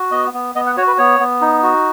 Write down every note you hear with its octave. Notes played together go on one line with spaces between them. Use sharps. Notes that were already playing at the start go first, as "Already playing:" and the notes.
Already playing: F#4
B3 D#5
B3
B3 D#5
F#5
F#4 C#5
B4
B3 C#5
B3
D#4
F#4